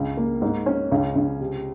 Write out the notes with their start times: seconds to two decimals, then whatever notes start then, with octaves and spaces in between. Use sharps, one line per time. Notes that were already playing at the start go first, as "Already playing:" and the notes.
Already playing: C#2
0.17 A#3
0.42 G#2
0.66 C#4
0.92 C#2
1.16 C#2
1.40 C3